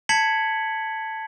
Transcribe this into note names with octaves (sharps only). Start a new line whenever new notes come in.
A5 G#6 B6 C#7 F#7